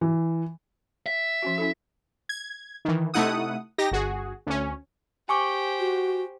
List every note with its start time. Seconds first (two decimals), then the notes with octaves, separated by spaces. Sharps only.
0.01 E3
1.06 E5
1.42 F3 C#4 F#4
1.58 C#4 E4 A4
2.29 G#6
2.85 D#3 E3
3.14 C3 A3 D#4 E4 F#5 D#6
3.78 D#4 G4 A#6
3.92 G1 F#4 G#4
4.46 D2 C#4
5.29 G4 C5 G#5 C#6 D6
5.79 F#4